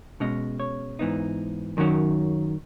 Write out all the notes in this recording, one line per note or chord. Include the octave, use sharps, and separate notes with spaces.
B2 G#3 C#4 D#5
C#5
G#2 E3 B3 D#4
F#2 D#3 F#3 C#4